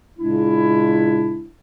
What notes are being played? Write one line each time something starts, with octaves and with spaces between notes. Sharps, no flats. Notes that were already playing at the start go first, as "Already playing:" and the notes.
A#2 C#3 G#3 D4 E4